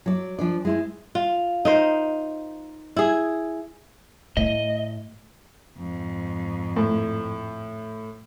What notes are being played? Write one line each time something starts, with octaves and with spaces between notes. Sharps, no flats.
F#3 D5
F3 D4 D5
G#3 E4 C5
F4
D#4 A#4 C5
E4 G#4
A2 D#5
F2 G#2
A2